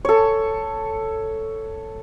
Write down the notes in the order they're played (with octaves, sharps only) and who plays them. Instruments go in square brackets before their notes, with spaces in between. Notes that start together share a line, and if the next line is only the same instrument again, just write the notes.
[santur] A4 C#5